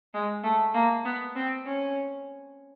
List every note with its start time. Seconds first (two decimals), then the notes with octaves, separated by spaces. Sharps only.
0.14 G#3
0.44 A3
0.74 A#3
1.05 B3
1.35 C4
1.65 C#4